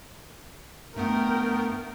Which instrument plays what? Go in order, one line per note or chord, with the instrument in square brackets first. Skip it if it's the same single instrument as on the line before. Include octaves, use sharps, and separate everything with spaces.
[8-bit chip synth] G2 A3 B3 [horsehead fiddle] A#4 G5